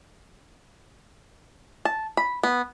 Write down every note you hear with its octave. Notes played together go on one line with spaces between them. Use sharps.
A5
B5
B3